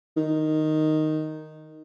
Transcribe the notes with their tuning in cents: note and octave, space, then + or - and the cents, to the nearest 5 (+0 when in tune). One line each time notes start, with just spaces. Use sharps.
D#3 -5